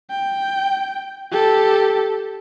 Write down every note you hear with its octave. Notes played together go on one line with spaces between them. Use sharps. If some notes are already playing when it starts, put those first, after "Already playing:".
G5
G4 A4